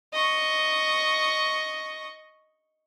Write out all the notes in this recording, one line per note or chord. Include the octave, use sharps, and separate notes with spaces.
D#5 C#6